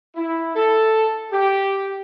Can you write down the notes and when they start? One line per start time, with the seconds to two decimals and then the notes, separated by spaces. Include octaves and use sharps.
0.15 E4
0.54 A4
1.30 G4